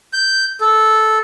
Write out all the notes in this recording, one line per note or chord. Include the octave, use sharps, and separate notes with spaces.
G6
A4